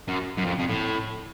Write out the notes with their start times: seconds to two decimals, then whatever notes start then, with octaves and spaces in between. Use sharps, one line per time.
0.08 F#2
0.38 F#2
0.46 F2
0.60 F2
0.70 A2